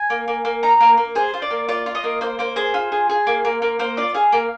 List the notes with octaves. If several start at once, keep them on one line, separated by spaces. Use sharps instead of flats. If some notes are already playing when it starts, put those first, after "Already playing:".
Already playing: G#5
A#3
A#3
A#3
D#4 A#5
A#3
A#3
G#4 C5
F4
D5
A#3
F4 D5
F4
D#5
A#3
A#3 C5
A#3 C5
G#4 C5
F4
G#4
G#4
A#3
A#3
A#3
A#3 C5
F4 D5
G#4 F5
A#3